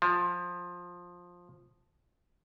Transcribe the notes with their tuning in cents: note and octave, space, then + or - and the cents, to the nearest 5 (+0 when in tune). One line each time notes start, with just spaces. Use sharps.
F3 +15